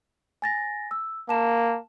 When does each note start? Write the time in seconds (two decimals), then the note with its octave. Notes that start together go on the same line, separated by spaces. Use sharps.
0.42 G#5 A6 A#6
0.91 E6
1.29 A#3 A5 E7